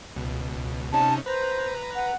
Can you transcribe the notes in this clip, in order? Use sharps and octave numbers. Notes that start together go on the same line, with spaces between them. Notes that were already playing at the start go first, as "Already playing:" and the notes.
C#2 B2
C3 C#4 D#4 A5
B4 C5 A#5
F#5